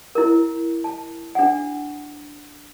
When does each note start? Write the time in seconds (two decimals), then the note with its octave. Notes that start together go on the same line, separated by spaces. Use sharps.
0.15 E4 A#4
0.84 A5
1.35 D4 F#5